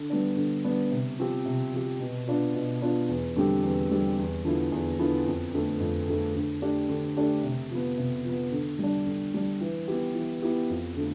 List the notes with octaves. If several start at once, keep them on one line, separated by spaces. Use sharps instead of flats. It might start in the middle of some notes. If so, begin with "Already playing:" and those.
Already playing: D3
G3 B3 D4
D3
G3 B3 D4
C3
F3 C4 G4
C3
F3 C4 G4
B2
B3 D4 F4
B2
B3 D4 F4
E2
D3 G3 C4 G4
E2
D3 G3 C4 G4
E2
D3 F3 B3 E4
E2
D3 F3 B3 E4
F2
D3 A3
F2
D3 A3
D3
A3 D4 G4
D3
A3 D4 G4
C3
F3 B3
C3
F3 B3
D3
G3 D4
D3
G3 D4
E3
B3 E4 G4
E3
B3 E4 G4
F2
D3 A3